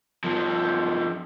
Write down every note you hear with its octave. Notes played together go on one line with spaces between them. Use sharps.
G2 F3